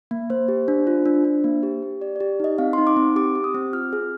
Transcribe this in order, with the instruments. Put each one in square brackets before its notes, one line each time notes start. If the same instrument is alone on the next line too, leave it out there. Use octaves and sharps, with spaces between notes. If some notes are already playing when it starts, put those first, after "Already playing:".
[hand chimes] A#3
A#3 C5
G4
D4
F4
D4
D4
A#3
G4
G4
G4 D5
G4 D5
D#4 D#5
C4 F5
D#4 C6
D6
C4
G4 D6
G4
D#6
C4
F4 F6
G#4